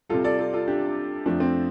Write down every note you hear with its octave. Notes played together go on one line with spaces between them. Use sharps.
C3 G3 F4 A4
A4 D5
F4 A4
F4 A4
D4 G4
F2 F3 A3 D4
C4